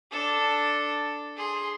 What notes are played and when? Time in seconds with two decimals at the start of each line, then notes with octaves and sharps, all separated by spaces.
0.11 D4 A4
1.36 G#4 C6